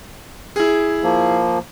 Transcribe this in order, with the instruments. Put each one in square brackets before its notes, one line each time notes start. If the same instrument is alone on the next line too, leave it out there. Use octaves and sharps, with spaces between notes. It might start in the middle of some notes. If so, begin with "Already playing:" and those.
[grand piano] E4 G#4
[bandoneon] F3 A#3